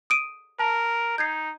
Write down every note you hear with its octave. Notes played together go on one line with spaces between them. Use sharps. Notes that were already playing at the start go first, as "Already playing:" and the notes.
D#6 D7 D#7
A#4 A5
D#4 G6 G#6 C7